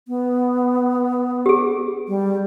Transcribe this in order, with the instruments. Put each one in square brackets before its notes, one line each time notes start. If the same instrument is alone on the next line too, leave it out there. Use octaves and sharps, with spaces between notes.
[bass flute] B3
[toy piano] G4 G#4
[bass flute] G3